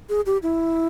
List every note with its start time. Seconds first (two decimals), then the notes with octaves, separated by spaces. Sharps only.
0.09 G#4
0.26 G4
0.43 E4